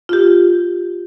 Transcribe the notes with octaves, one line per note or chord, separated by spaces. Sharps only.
F4 G4